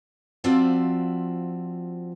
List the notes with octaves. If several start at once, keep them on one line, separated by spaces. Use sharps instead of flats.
F3 C4 F4 F#4 D5 E5